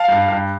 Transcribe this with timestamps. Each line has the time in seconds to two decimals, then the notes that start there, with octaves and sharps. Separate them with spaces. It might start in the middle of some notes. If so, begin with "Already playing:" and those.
Already playing: F5 A5
0.08 G2
0.28 G2